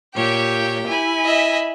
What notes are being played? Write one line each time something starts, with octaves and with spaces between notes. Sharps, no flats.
A#2 G4 C#5 G5
E4 G#5 B5
D#5 E5